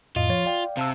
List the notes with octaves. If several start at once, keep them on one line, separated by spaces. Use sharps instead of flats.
F2 A2 F4 D#5
F3 C#5 A6
D5 F5 G5
C3 F5 A5 E6